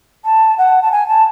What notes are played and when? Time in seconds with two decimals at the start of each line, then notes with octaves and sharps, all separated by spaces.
0.25 A5
0.58 F#5
0.82 A5
0.92 G#5
1.08 A5